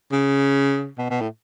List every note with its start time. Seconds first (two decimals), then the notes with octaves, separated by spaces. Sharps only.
0.12 C#3
0.99 B2
1.10 B2
1.21 A2